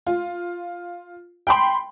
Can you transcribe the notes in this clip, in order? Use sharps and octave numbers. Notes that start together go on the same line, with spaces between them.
F4
G5 B5 C6